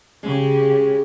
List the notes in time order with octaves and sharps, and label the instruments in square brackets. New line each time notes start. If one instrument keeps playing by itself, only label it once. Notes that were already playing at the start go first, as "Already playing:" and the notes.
[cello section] C#3 C#4 G4 [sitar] G#3